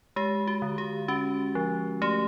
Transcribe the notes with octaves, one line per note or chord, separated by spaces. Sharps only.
G#3 G4
F#4
D3
G4
C#4 F#4
F3
A3 G4